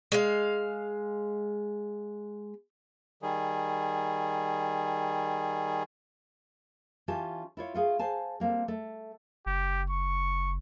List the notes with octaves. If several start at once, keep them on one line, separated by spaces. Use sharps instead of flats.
G#3 F5
D#3 G3 G#4
E3 C#4 F4 G4 G#5 A5
E4 F4 C#5
A3 F4 G#4
G#4 C5 F5 G#5 A5
G3 A#3 C4 A4
A3
F#1 G4
C#6